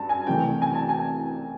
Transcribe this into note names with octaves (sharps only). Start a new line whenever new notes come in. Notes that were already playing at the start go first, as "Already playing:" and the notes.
Already playing: G2 A5
G#5
C2 C3 E3 A3 G5
G#5
A5
G#5